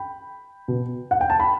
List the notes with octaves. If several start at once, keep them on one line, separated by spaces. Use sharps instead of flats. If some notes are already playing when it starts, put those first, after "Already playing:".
Already playing: G5 B5
B2
F#5
G5
A5
B5